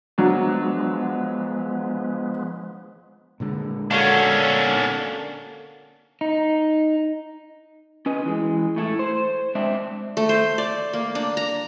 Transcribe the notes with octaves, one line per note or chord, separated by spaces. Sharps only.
F3 F#3 G#3 B3 D4
A#2 D3 G#3
A#3 C#4 D4 F#4 A4
D#4
C#4 B4 D#5
E3 G#3
A2 A3 E4
C5
G#3 C4 D4 E5
A3
C5
D5
A#3
D4
A#5